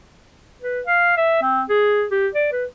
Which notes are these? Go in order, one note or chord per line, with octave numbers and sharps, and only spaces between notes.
B4
F5
E5
C4
G#4
G4
D5
B4